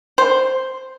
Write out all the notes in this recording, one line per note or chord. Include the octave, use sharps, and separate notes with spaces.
C5